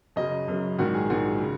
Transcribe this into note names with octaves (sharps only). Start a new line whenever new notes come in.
F#2 C#3 F#3 D#5
F#2 C#3 F#3
A#1 G#2 D#3 F#3 F#4
G#4
A#1 G#2 D#3 F#3 F#4
C#3